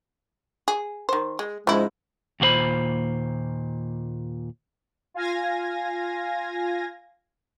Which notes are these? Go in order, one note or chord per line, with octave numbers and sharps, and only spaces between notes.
G#4
D#3 C5
G#3
G#2 C#3 F3 G#3 E4
D#2 A#2 F#4 C5 B5
F4 F5 G#5 G#6 A#6